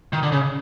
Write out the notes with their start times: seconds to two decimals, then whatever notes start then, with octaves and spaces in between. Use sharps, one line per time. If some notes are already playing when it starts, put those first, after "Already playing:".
0.13 D#3
0.23 D3
0.32 C#3